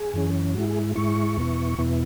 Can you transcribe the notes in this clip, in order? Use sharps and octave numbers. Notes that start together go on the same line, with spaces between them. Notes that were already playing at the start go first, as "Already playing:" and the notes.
Already playing: G#4
F#2 E3 C#4
G#2 G#3 E4 F#4
G#4
G#2 G#3 E4 C#6
E2 B2 B3 E4
E2 B2 B3 E4